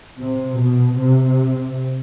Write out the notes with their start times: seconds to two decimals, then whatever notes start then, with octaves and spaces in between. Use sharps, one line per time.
0.20 C3
0.58 B2
0.97 C3